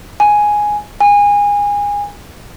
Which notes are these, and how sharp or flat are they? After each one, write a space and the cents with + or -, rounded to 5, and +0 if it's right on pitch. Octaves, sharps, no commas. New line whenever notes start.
G#5 +0
G#5 -25